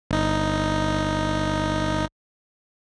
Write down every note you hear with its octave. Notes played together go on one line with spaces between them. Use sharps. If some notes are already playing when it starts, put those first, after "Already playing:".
G1 D#4